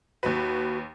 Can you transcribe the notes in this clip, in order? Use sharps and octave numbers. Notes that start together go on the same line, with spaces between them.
D#2 F#4 B4